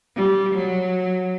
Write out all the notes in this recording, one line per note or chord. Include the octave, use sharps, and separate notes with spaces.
G3
F#3